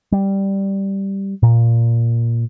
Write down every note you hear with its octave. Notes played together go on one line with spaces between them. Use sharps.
G3
A#2